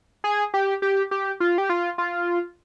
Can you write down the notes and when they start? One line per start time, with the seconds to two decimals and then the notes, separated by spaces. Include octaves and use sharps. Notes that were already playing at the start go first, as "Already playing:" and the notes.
0.24 G#4
0.54 G4
0.82 G4
1.11 G4
1.40 F4
1.58 G4
1.70 F4
1.98 F4